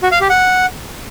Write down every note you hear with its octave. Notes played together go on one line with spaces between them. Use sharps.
F#4
F5
G4
F#5